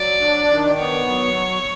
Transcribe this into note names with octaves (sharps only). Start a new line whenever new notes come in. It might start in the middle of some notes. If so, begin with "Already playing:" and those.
Already playing: F#3 D5
D4
D#3
B3 C#5
F#3